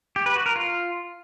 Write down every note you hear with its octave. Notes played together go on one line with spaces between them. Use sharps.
G4
B4
F#4
A#4
F4